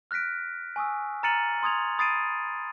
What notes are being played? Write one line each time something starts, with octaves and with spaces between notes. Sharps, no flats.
F6 F#6 A#6 B6 D7
G#5 C#6 D#6 E6
A#5 F6 A6 C#7 D#7 F#7
C6 D#6 G#6 F7
B5 D#6 A6 C7 D7 D#7